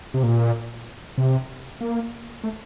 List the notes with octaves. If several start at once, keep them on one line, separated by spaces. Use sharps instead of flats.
C3
A#2
C3
A#3
A3